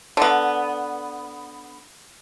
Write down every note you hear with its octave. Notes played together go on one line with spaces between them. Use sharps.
D3 B3